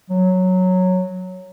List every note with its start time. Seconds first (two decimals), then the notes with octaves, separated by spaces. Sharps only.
0.10 F#3